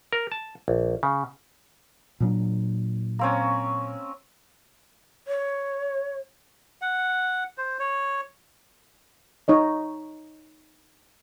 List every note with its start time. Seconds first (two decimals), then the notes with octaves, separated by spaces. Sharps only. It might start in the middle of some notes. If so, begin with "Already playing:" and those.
0.13 A#4
0.32 A5
0.68 A#1
1.03 C#3
2.20 A#2 F#3 D4
3.19 A#3 C4 C#4
5.27 C#5
6.82 F#5
7.58 C5
7.79 C#5
9.48 D#4 C#5 D#5